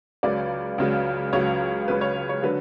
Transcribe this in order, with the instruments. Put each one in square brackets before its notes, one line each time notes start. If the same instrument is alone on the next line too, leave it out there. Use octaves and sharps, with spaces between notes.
[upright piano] C#2 C#3 F#3 D5
C#2 C#3 F#3
C#2 C#3 F#3 C#5
C#2 C#3 F#3 B4
C#5
C#5
D3 F#3 B4